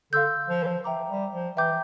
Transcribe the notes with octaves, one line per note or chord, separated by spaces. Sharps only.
D3 F5 C6 E6 G6
F3
E3
F3
E5 G5 A#5 D6
G3
F3
E3 E5 G5 A#5 D6 G6